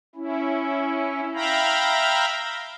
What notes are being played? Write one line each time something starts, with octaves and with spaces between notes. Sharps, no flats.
C#4 E4
E5 F5 G5 A#5 B5